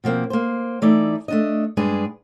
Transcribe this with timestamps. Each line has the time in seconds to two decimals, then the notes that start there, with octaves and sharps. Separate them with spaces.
0.04 B2 F3 A#3 C4
0.30 A#3 C5
0.82 E3 A3 D#4 E4 D5
1.28 A3 D4 D#5
1.77 G2 G#3 D4 G#4 B4